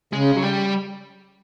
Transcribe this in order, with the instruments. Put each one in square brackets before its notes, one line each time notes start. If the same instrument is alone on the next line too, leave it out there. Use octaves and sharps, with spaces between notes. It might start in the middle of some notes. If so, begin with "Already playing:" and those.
[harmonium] C#3 [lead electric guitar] G#3
[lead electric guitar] F#3
G3